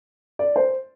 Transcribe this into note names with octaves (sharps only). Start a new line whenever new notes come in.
D5
C5